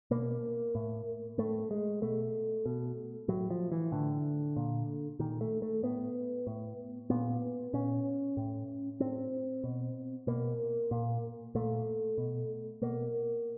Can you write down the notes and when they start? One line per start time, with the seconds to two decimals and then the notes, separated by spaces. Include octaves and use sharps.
0.11 B2 A#3
0.75 A2
1.38 A2 A3
1.71 G#3
2.02 B2 A3
2.66 B2
3.28 A2 F#3
3.50 F3
3.72 E3
3.92 A2 D3
4.56 A#2
5.19 A#2 D#3
5.41 A3
5.62 A3
5.83 A2 B3
6.47 A2
7.10 A#2 B3
7.73 A#2 C#4
8.37 A2
9.00 A2 C4
9.64 B2
10.27 B2 A#3
10.91 A#2
11.55 A#2 A3
12.18 B2
12.82 B2 A#3